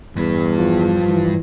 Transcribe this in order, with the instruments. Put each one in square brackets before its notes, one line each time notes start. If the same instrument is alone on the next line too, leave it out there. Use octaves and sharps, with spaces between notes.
[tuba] E2 [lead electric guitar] G2 B4
[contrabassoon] F3
[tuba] E3